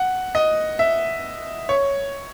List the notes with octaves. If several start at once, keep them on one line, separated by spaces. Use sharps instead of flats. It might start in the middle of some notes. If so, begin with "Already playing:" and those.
Already playing: F#5
D#5
E5
C#5